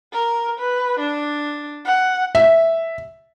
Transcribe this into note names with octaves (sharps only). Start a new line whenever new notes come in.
A#4
B4
D4
F#5
E5